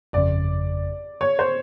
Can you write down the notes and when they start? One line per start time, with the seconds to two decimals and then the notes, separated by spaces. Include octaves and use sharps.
0.13 G1 F2 C#3 D5
1.21 C#5
1.39 C5